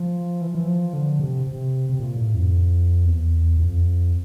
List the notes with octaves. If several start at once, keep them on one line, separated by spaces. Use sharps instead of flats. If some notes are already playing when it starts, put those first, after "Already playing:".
Already playing: F3
E3
F3
E3
F3
D3
C3
C3
C3
A#2
A2
F2
E2
F2